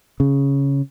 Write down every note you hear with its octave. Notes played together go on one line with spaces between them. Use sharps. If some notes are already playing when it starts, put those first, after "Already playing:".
C#3